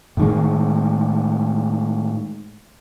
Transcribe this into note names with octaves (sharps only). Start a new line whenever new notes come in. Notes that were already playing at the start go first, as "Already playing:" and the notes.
A2 D#3 G#3